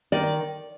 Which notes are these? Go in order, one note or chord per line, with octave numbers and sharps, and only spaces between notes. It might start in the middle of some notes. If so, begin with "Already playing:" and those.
D#3 D5